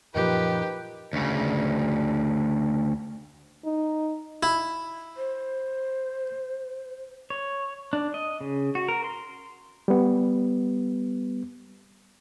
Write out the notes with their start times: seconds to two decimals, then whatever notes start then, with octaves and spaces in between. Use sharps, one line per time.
0.15 F#2 A#2 D#3 F3 G4 B4
1.13 D2 C#3
3.65 D#4
4.43 E4
5.17 C5
7.30 C#5
7.93 D4
8.14 D#5
8.41 C#3
8.75 F#4
8.88 A#4
9.04 C6
9.88 G3 B3